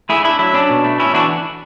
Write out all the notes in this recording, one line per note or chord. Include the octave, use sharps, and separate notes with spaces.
A3 E4 G#4
D4 E4
F#3 E4
C#4 D4
B2
A3
C#4 E4
E3 D4 F#4